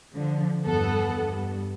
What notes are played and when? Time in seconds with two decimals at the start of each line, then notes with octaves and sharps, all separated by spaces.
0.14 D3 F3
0.63 E2 G2 B3 A4 F#5
1.17 G2